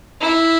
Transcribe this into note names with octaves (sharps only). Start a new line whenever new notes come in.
E4